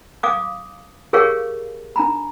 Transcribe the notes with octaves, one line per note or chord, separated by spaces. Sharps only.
F5 D6 D#6
G4 G#4 A#4 C#5 F5 C#6
D4 A#5 B5